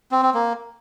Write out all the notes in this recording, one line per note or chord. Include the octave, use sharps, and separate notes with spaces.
C4
C4
A#3